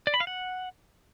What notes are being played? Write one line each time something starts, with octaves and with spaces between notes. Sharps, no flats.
D5
B5
F5
F#5